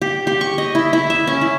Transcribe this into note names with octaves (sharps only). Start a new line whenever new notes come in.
G4
G4
C#6
D#5
E4
E4
E5
C#4
E4